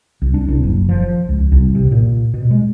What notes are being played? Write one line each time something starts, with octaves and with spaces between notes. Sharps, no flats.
C2
D4
C2
F#1
F3
C#2
C2
C3
A#2
B2
G#3